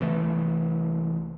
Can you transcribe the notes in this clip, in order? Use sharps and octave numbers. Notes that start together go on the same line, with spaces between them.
C2 E3 A3